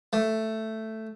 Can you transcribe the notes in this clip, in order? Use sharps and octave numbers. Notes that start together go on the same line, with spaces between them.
A3